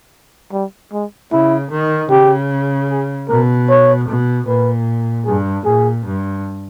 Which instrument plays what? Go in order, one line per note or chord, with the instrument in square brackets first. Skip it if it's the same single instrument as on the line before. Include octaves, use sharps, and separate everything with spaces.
[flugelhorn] G3
G#3
[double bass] C#3 [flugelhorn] E4
[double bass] D#3
[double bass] C#3 [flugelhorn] G4
[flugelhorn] G#4
[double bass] B2 [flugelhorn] A#4
[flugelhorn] C#5
[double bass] B2
[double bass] A#2 [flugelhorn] B4
[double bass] G2 [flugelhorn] G#4
[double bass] A#2 [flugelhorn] G#4
[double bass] G2